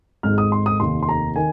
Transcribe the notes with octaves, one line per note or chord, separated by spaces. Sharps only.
G#1 G#2 G#3 F6
D#6
C6
D#6
F1 D#2 D#3 C6
C6
A#5
D#3 G#5